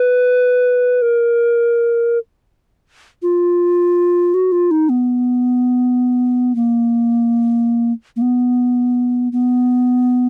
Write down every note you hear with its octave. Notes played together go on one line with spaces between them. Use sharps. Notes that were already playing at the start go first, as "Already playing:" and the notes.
Already playing: B4
A#4
F4
F#4
F4
D#4
B3
A#3
A#3
B3
B3